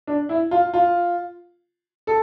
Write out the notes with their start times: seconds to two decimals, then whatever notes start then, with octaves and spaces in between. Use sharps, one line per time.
0.07 D4
0.29 E4
0.51 F4
0.74 F4
2.07 A4